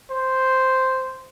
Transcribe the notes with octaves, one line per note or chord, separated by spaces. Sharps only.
C5